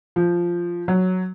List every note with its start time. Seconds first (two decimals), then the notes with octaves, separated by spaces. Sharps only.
0.16 F3
0.88 F#3